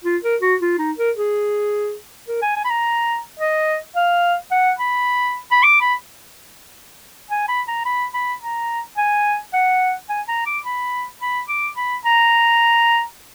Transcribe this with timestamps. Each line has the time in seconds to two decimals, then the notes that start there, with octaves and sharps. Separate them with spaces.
0.04 F4
0.23 A#4
0.42 F#4
0.61 F4
0.79 D#4
0.98 A#4
1.16 G#4
2.28 A#4
2.42 G#5
2.56 G#5
2.65 B5
2.70 A#5
3.40 D#5
3.96 F5
4.51 F#5
4.78 B5
5.51 B5
5.63 D6
5.81 B5
7.30 G#5
7.48 B5
7.68 A#5
7.85 B5
8.14 B5
8.42 A#5
8.97 G#5
9.54 F#5
10.09 G#5
10.28 A#5
10.46 D6
10.65 B5
11.21 B5
11.48 D6
11.77 B5
12.05 A#5